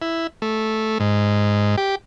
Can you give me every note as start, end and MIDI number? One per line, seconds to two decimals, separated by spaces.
0.02 0.27 64
0.42 0.98 57
1.00 1.76 44
1.78 1.95 67